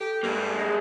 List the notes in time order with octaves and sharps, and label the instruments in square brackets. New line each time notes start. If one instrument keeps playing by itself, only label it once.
[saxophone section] G4 [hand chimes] A4
[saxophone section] G2 [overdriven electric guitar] G#3 A#3
[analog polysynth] G#4 [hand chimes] D#5 A#6